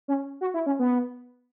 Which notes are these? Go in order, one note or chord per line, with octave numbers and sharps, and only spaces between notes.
C#4
F#4
E4
C#4
B3